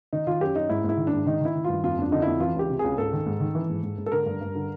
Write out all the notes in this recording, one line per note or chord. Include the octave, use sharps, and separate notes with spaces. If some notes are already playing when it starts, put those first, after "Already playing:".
D#3 D#4
D#3 F4
F#2 G4
F#2 D#4
G#2 E4
G#2 E4
D#3
D4
G#2
D#3 D#4
D#3 E4
D#3
G2 F4
F2 F4
F2 D4
D3 D#4
F2 E4
E3 F4
C#2 G4
C3
C#2 G#4
G#2 A4
D#3
G#2
D#3
E3
G#2
G#2
G#2
A4
D3 A#4
G2
G2
D3